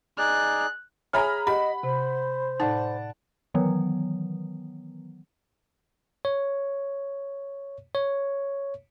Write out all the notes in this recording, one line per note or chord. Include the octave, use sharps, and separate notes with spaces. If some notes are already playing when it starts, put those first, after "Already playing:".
D#4 G#4 D5 F#6
G#4 C#5 E5 G#5 A#5 B5 F6
G4 D#5 F#5 B5
C3 C5
A2 D#4 D5 F#5 A5
D#3 E3 F#3 B3
C#5
C#5